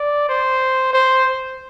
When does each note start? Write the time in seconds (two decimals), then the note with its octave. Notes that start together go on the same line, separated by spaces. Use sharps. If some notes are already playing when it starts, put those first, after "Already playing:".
Already playing: D5
0.29 C5
0.93 C5